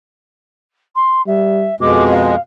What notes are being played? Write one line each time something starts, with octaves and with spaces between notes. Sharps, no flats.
C6
G3 E5
F2 B2 G#3 D6
F5